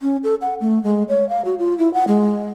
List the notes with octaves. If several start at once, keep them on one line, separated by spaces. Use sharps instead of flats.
C#4
A4
F#5
A3
G#3
C#5
F5
F#4
F4
E4
F#5
G#3